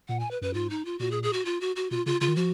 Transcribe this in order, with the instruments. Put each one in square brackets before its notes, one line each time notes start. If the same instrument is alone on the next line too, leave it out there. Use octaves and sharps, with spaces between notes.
[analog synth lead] A#2 [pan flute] F#5
[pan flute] G#5
B4
[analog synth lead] F#2 [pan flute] B4
[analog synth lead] G#2 [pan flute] F4
[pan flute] D#4
F4
[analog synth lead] A#2 [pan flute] F#4
[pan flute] G#4
G#4
F#4
F4
F#4
F#4
[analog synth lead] B2 [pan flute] F4
[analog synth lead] C#3 [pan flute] F4
[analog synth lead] C#3 [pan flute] F4
[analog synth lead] D#3
[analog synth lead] F3 [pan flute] F#4